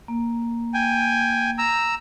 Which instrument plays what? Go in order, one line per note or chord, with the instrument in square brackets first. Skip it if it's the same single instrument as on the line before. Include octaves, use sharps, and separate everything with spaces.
[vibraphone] A#3
[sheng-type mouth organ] G5 G#5
A#5 E6